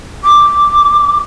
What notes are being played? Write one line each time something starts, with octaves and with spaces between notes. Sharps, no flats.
D6